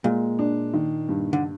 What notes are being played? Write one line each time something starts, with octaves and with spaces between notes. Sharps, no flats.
A#2 G#3
D4
D#3
G2
D3